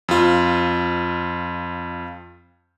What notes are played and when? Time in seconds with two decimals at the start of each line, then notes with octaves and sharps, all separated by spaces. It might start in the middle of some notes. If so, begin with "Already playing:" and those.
0.08 F2 F4